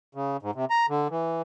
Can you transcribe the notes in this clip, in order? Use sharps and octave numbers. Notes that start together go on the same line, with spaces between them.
C#3
G#2
C3
A#5
D3
E3